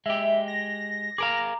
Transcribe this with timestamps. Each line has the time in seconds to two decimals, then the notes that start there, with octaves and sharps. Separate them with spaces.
0.06 G#3 G4 E5
0.48 A#6
1.18 G#4 A#4 F5 A#5 D6